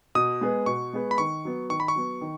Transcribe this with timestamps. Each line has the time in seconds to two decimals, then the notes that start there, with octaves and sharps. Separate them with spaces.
0.15 B2 D#6
0.41 G#3 B3 G#4 B4
0.66 B2 C#6
0.93 G#3 B3 G#4 B4
1.11 B5
1.18 D#3 C#6
1.45 F#3 B3
1.70 D#3 C#6
1.80 B5
1.88 C#6
1.96 F#3 B3
2.21 D#3